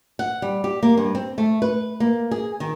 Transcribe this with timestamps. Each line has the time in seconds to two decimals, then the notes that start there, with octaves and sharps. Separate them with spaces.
0.19 F#5
0.42 G3
0.64 G4
0.83 A#3
0.97 G2
1.15 C4
1.38 A3
1.62 B4
2.00 A#3
2.31 G#4
2.60 D#3